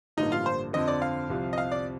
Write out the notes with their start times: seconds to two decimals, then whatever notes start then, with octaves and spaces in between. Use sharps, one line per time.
0.17 A1 G2 D3 F3 A#3 D#4
0.32 F4
0.46 C5
0.73 F2 D3 F3 C4 D#5
0.88 D5
1.02 F5
1.29 C2 C3 F3
1.53 D#5
1.58 F5
1.72 D5